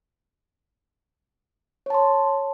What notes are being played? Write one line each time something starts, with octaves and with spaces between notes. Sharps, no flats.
C#5 A5 C6